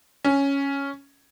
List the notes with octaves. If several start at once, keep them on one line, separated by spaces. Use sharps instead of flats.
C#4